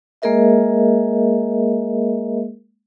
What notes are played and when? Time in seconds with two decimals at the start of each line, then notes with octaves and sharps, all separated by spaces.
0.22 G#3 A#3 G#4 A#4 D#5 E5